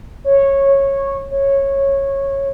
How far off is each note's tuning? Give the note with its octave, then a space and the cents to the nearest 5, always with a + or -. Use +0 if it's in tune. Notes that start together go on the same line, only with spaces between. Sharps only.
C#5 -15
C#5 -15